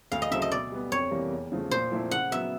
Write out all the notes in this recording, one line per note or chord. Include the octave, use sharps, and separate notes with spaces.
D2 F5
D#5
C#3 F#3 A3 C4 E5
D#5
B2 D5
G3 B3
F2 C#5
C3 E3 G3 A#3
E2
C#3 F3 A3
A#2 C5
F3 A3 C4 E4
C#3 F#5
F#3 B3 E5